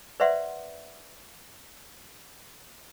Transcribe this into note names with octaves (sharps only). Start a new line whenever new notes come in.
B4 C5 D5 E5 F#5 C6